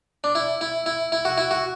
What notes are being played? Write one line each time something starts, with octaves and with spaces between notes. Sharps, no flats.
D4
E4
E4
E4
E4
F#4
E4
F#4